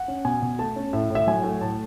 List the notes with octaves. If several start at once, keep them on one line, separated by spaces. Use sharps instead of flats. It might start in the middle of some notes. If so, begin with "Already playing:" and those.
Already playing: F#5
C#4
B2 G#5
B2
A3 A5
C#4
A2 E5
A2
E5
F#3 G#5
A3
A2 A5